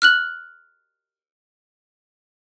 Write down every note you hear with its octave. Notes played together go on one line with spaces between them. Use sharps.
F6 F#6 F#7